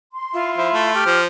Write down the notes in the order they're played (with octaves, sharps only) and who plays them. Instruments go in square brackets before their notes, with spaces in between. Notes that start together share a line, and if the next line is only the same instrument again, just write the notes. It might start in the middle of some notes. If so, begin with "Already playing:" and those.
[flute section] C6
[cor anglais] E4 [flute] F4
[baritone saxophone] F3 [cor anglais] E4
[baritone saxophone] A3
[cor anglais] G4 [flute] F6
[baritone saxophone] F3 [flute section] C6